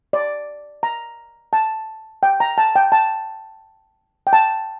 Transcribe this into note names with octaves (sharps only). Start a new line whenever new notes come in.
D5
A#5
A5
G5
A#5
A5
G5
A5
G5
A5